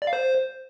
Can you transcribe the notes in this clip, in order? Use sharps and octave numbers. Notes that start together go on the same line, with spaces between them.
D5
F5
C5